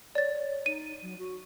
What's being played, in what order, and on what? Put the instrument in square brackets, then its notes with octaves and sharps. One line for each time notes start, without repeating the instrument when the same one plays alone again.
[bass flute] C#5 [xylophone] D5 A6
[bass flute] C#5
[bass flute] D#4 [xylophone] D#7
[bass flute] F#3
F#4